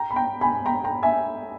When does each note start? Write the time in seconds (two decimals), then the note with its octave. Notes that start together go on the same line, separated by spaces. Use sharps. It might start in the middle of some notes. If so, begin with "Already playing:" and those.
Already playing: G5 A#5
0.11 B5
0.16 G5 A#5
0.41 G#5 B5
0.66 G5 A#5
0.84 G5 A#5
1.03 E5 G#5